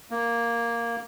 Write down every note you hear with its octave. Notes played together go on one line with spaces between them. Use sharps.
A#3